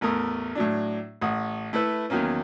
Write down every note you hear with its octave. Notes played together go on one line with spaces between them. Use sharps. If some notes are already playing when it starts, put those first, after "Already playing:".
A1 E2 A3 A#4 D#6
A2 F#3 D4
A1 F#5 D#6
A3 E4 A4 B4
E2 D#3 F#3 A#3 C#4